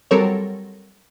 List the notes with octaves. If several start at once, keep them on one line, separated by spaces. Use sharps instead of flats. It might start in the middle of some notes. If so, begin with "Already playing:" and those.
F#3 G3 C4 A4 A#4 C#5